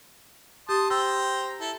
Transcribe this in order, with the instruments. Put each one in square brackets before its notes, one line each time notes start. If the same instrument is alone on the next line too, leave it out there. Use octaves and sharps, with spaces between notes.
[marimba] G4 [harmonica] A5 C6 D#6
[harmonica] C5 G5 A#5 [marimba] E6
[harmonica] E4 A4